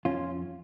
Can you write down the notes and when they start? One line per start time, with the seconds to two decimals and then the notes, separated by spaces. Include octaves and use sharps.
0.05 F2 C#4 F4